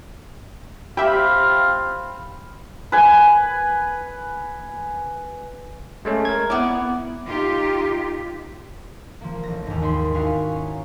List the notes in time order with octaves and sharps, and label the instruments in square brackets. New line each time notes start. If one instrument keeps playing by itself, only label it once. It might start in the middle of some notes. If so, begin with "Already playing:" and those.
[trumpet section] C4 F4 F5 [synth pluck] G4 E5 [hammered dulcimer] B5
[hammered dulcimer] B4 G#5
[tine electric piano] G#3 A3 C#4
A#4 G#6
[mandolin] B3 D5 [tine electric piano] E4
[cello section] D#4 F4 G4
[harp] F3 A#3
A1 A#6
D#2 G#2
D#2 B5 C6
D#4 E4 F#4 A#4 F5 G#5
C#4